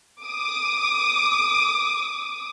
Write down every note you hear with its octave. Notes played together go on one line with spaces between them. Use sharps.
D6 D#6